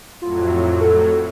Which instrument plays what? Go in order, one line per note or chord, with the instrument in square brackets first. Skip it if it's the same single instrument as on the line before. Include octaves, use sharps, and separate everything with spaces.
[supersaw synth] F2 A2 F#3 [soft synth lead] F4
[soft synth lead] A4